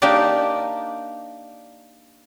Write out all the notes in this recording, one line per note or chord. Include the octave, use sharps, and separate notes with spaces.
A#3 D4 D#4 G4 D5